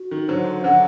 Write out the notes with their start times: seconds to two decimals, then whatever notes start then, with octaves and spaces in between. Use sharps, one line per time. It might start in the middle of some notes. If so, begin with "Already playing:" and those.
Already playing: F#4
0.11 D#3
0.28 D3 F#3 C5
0.64 D3 F#3 F#5